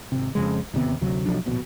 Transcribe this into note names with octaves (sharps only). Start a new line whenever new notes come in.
G#1 C3
F2 C#3 G#3
D1 D#2 C3 B3
D2 C3 F#3
B1 F3 F#3 D4
D1 A#1 B2